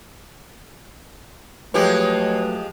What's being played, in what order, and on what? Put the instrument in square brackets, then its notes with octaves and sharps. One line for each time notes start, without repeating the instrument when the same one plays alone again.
[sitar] F3 G#3 G4 [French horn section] F#3 A3 [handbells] B4 [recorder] C#5